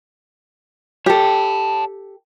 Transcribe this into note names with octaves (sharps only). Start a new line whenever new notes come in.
G4 A4 C#5 G5 A5